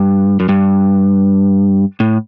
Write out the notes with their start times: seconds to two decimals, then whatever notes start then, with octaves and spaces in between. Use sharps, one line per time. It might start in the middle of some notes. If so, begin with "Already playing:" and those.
Already playing: G2
0.40 F#2
0.49 G2
2.00 A2